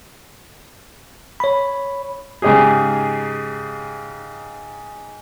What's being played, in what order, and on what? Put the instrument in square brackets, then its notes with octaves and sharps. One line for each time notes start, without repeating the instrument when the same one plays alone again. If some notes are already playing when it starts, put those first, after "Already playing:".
[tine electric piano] C#5 B5
[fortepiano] G#2 C#3 D#4 G4 G#4